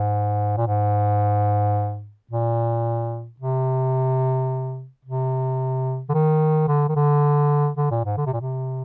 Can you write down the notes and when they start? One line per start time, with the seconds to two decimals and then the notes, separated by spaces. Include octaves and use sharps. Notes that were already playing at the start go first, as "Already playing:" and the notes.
Already playing: G#2
0.57 A#2
0.67 G#2
2.31 A#2
3.40 C3
5.05 C3
6.09 D3
6.14 D#3
6.68 D3
6.88 D#3
6.96 D3
7.77 D3
7.91 A#2
8.05 G#2
8.17 D3
8.26 C3
8.33 A#2
8.41 C3